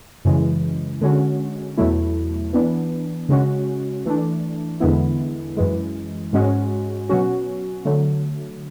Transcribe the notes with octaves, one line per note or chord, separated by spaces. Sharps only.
F#2 C#3 E3 G#3
D3 G#3 C#4 F#4
E2 B2 F#3 A3 E4
E3 B3 D4
C#3 G#3 C#4 F#4
E3 A3 D4
E2 D3 G#3 B3 E4
F#2 E3 G#3
G#2 G#3 C#4 F#4
B2 F#3 C#4 F#4
D3 F#3 A3